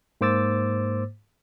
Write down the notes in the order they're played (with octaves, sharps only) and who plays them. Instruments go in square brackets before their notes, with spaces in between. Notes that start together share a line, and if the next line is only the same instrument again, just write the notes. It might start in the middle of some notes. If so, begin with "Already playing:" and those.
[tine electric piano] G#2 A#3 C5 D6 E6 A6